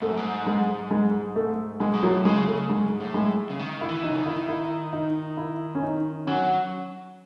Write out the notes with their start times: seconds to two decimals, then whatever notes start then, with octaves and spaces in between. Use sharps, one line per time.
0.02 G#2 A3
0.09 F#2
0.17 G#2
0.47 G#3
0.91 G#3
1.36 A3
1.80 G#2 G#3
1.94 B2
2.02 A2 F#3
2.25 C#3 G#3
2.47 C#3 A3
2.70 G#2 G#3
3.00 A2
3.14 G#3
3.50 C#3
3.59 D#3
3.81 E4
3.89 E3
4.03 D#4
4.09 C#3
4.18 D#3
4.26 E4
4.48 E4
4.93 D#4
5.37 E4
5.75 C#4
5.83 D#4
6.27 F#3 C#4